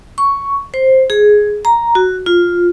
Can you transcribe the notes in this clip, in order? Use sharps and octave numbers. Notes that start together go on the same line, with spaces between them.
C#6
C5
G#4
A#5
F#4
F4